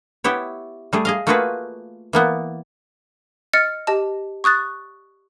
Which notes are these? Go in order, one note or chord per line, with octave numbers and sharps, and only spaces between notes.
B3 E4 G4 C#5
G3 A3 G#4
G#4 D#5 F5
A3 A#3 F4 F#4 G#4 B4
E3 A#3 B3
D#5 F6 A6 C#7
G4 D#5 A5
C#6 D#6 F#6 A6